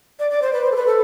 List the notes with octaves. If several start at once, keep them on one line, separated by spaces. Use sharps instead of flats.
D5
D5
C5
B4
C5
A4
B4
A4